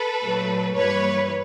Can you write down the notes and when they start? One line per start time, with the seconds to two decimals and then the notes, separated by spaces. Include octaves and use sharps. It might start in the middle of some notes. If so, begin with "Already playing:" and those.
Already playing: A4 B4
0.22 A#2 F#3 A3
0.75 G2 E3 G3 A#3 B4 C#5